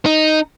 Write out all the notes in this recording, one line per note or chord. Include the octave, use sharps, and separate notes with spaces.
D#4